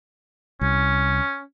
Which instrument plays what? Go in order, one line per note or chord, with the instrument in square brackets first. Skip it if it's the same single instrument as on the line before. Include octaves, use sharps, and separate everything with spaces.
[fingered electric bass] C2 [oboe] C#4